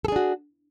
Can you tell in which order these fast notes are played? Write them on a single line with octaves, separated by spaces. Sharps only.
A4 G#4 D4 F#4